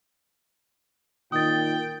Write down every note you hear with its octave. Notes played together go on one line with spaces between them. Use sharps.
A#2 D#3 G5 D#6 A6